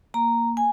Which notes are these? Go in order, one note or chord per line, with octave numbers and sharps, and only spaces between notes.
A#3 A#5
G#5